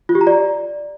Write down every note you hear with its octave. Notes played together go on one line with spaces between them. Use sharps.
F4
G4
A#5
D5